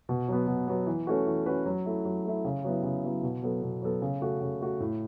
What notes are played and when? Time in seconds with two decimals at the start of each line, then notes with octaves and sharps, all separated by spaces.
0.09 B2
0.28 F#3 B3
0.47 B2
0.67 F#3 B3
0.87 E3
1.07 A3 C#4 F#4 B4
1.27 E3
1.46 A3 C#4 F#4 B4
1.66 F#3
1.86 A3 E4
2.05 F#3
2.25 A3 E4
2.45 C#3
2.64 F#3 B3 E4
2.83 C#3
3.03 F#3 B3 E4
3.23 B2
3.43 F#3 B3 A4
3.62 B2
3.82 F#3 B3 A4
4.02 C#3
4.22 A3 F#4
4.41 C#3
4.61 A3 F#4
4.80 A2